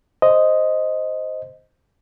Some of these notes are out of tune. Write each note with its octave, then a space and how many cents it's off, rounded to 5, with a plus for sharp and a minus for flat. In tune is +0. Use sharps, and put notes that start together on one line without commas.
C5 +0 D#5 +0